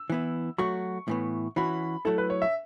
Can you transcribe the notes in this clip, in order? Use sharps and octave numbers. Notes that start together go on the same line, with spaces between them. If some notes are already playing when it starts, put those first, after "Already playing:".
Already playing: E6
E3 B3 E4
F#3 A3 F#4 C#6
A2 E3 B3
E3 C#4 F#4 B5
F#3 A3 E4 A4
B4
C#5
E5